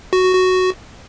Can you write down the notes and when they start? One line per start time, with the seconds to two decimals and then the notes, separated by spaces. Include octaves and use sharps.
0.13 F#4
0.23 F#4
0.34 F#4